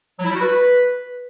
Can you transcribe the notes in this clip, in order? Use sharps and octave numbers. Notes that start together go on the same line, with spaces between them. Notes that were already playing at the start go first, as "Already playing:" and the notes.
F#3
E4
G3
F#4
B4